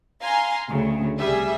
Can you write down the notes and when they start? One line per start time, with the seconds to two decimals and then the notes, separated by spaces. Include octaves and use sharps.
0.21 F5 G#5 A#5 C6
0.68 D2 C#3
1.19 C2 G3 G#4 E5